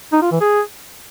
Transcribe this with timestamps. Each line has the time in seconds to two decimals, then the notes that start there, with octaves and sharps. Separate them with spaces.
0.12 D#4
0.22 F4
0.31 E3
0.41 G#4